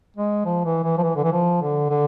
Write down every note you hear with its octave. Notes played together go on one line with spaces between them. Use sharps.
G#3
F3
E3
E3
F3
E3
D3
E3
F3
D3
D3